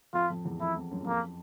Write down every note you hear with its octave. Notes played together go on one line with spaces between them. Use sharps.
F2 F4
F2
E2
F2 E4
F2
F#2
F#2
F2 A#3